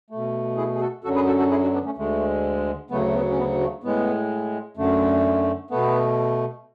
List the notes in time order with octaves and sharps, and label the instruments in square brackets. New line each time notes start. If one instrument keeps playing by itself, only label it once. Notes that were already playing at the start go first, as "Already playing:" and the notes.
[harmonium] B2 A3
E4 G#4
G#4
F#4 A4
F#2 D3 F#3 F#4 A4
G#4 B4
F#4 A4
F#4 A4
E4 G#4
D4 F#4
B3 D4
A3 C#4
D2 D3 G#3 A3
D2 C#3 F#3 A3 B3
A3
B3
C#4
B3
A3
A2 G#3 B3
F#2 D3 A3
B2 A3 B3